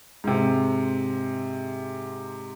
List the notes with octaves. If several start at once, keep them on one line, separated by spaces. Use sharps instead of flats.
G#2 C3